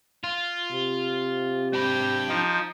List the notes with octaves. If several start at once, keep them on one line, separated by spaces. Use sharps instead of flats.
F4
C3
D4 G4 B5
F3 D#4